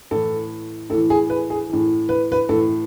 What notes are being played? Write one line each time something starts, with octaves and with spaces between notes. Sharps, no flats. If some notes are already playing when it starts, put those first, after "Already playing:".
A2 E3 A4
A2 E3 A4
G#4
B4
G#4
A2 E3
B4
B4
A2 E3 A4